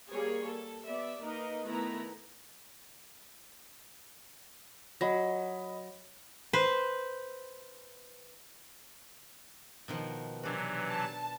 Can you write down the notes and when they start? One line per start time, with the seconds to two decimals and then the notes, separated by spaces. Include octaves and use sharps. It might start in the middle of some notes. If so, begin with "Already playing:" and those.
0.11 G3 A#3 G#4 C#5
0.46 A4
0.86 B3 D5 E5
1.20 A#3 D#4 A#4 B4 D#5
1.65 D#3 A3 B3 E4 B4 A#5
5.01 F#3 D#5 B5 A#6
6.53 B4 C5
9.88 B2 D#3 F3
10.43 C3 E3 F#3 D4 F#4
10.89 A5